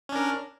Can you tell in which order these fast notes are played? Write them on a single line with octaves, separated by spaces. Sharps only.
C#4 D4 A#4